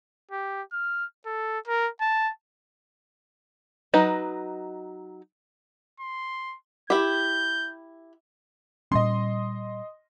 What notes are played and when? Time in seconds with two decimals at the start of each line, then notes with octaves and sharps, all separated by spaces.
0.31 G4
0.73 F6
1.26 A4
1.67 A#4
2.01 A5
3.94 F#3 D#4 B4 D#5
6.00 C6
6.90 E4 G4 G6
8.92 A#2 G3 C#4 D#5 C6